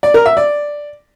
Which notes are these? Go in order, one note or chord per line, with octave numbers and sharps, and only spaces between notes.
D5
A#4
E5
D5